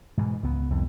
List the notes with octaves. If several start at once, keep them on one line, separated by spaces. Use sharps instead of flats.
G#2 B2 E3
C#2 B3
C2 F2